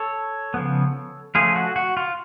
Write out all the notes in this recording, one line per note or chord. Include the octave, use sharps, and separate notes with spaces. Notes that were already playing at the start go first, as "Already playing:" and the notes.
Already playing: A4 C#5
C#3 F3 B3
F3 A3 C#4 F4 G#4
F#4
F#4
F4